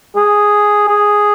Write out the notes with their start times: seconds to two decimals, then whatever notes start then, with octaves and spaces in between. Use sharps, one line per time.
0.16 G#4
0.88 G#4